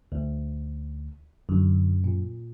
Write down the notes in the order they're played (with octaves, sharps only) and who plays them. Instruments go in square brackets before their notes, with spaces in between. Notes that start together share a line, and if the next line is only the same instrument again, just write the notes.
[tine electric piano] D2
[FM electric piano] F#2 [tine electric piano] D3
[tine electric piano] A#2